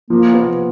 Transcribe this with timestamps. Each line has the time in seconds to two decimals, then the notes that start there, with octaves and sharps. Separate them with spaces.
0.10 F3 A#3
0.34 B3